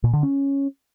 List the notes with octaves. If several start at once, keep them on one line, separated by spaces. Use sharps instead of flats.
A#2
D3
C#4